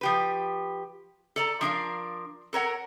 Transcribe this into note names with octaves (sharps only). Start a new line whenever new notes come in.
F3 G4 B4
A4 D5 A#5
F3 D4 A#4 F5
A4 A#4 C#5 F#5